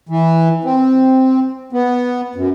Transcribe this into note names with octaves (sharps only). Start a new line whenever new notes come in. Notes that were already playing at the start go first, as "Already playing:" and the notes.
E3
C4
B3
F#2